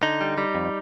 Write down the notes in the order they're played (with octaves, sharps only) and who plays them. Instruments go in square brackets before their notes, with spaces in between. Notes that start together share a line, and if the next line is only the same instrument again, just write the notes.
[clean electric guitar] D3 D#4
G3
G3
F2